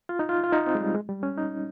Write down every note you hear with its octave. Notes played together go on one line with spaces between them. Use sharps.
F4
D#4
F4
F4
D#4
C4
G#3
G3
G#3
G3
C#4
D#4